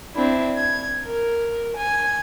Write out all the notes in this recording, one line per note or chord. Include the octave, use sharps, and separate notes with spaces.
C4 D4 E4
G#6
A#4
G#5